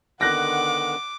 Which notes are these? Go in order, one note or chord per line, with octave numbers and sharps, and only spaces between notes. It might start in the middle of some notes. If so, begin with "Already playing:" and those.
D3 D#3 B3 F#5 D6 F#6 A#6